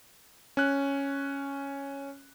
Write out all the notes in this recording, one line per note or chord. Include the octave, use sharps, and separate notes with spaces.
C#4 F#6